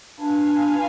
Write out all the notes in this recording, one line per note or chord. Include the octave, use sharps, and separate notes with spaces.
D4 F4 B4 F5 G#5